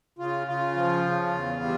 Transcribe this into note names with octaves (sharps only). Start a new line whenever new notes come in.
C#3 F4
C#3 F4
F3
C#3
E2
G3